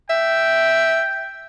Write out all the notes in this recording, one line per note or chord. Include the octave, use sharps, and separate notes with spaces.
E5 G5